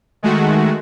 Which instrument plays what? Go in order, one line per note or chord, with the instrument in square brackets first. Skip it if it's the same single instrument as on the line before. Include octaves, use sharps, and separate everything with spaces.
[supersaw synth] D#3 G#3 A3 F#4